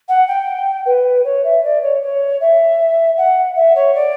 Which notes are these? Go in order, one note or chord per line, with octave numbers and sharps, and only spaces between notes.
F#5
G5
B4
C#5
E5
D5
C#5
C#5
E5
F#5
E5
C#5
D5